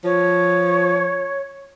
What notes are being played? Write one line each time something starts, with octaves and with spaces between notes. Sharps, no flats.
F3 C#5